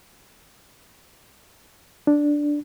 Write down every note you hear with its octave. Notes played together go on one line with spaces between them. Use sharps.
D4